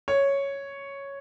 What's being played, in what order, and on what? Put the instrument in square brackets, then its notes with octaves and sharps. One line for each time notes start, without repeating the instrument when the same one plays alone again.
[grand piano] C#5